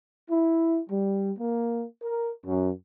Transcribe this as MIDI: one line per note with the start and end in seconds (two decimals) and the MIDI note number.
0.30 0.79 64
0.90 1.31 55
1.38 1.85 58
2.02 2.31 70
2.45 2.70 42